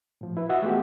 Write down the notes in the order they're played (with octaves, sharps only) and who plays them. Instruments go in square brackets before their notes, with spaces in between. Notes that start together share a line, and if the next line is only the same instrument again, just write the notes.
[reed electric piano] A2 F3
E4 B4
F#4 D#5 E5 F#5
E3 G#3 A3 B3 F4 G4